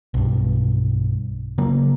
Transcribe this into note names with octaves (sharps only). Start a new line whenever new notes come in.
B1 G2
C#3 F#3 A#3